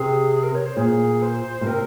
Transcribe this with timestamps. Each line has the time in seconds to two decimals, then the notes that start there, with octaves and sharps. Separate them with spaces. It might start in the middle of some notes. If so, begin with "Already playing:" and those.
Already playing: C3 G#4
0.35 G#4
0.43 A#4
0.55 C#5
0.65 C5
0.77 A#2 G#4
1.22 C5
1.61 A#2
1.66 C3 A#4